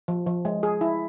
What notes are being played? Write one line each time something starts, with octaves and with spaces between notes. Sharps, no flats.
F3
F3
G#3
G#4
E4